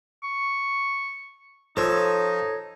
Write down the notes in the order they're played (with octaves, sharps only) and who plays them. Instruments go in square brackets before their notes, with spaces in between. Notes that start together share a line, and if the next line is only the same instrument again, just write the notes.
[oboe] C#6
[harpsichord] F3 [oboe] D#4 [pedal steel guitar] A4 C#5 E6